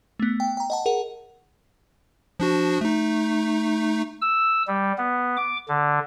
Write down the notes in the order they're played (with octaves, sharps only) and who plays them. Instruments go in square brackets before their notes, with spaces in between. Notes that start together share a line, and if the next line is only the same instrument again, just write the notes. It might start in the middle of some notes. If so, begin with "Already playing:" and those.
[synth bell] A3 B3
G5
G5 A#5
D#5 F#5 A5
G#4 A#4 F#5
[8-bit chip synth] F3 D4 F#4
A3 D#4
[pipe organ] E6
G3
B3
D6
D3